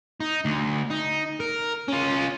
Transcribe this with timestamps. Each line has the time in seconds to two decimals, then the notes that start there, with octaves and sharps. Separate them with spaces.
0.20 D#4
0.45 D2
0.91 D#4
1.40 A#4
1.88 C#4 F4